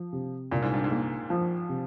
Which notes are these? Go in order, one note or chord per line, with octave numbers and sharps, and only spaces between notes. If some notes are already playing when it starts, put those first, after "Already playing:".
Already playing: F3
C3
C2 A#2
G#2
G2
G#2
A#3
F3
C3